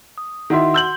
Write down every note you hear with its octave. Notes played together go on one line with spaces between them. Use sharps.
D#6
D#3 E4 F#4 E5 F#5 C6
E6 G6 F#7